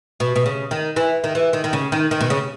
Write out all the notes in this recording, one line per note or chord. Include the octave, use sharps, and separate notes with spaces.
B2
B2
C#3
D#3
E3
D#3
E3
D#3
D#3
C#3
D#3
D#3
B2
C#3